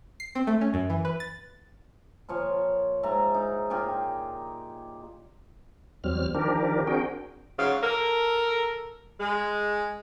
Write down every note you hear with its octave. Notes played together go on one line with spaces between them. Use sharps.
C7
C4
A3
C#4
F#2
E3
B4
A6
A#2 F3 C#5
G#2 E5 G#5 A#5
D#4
A#2 G4 F5 G#5
E2 F#3 G3 C4 F6
D#3 F3 D4 G4 A#4
C4 D4 F#4 G#4 A#4 G5
G#2 C#3 F#3 F5
A4 A#4
G#3